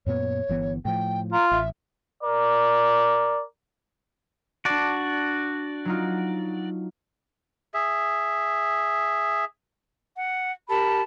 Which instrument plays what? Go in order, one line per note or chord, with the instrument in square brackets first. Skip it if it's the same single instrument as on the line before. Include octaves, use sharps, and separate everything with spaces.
[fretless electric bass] F#2 A#2 B3 [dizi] C#5
[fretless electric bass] G1 E3 B3
[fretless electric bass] A2 F3 [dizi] G5
[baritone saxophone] F4 [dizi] A#5
[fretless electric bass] A1 [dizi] E5
[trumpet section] A#4 D5
[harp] D4 A5 [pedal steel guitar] F#4 D5
[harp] F#3 D#4 F4
[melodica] G#4 E5
[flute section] F#5
G4 A#4 A5 B5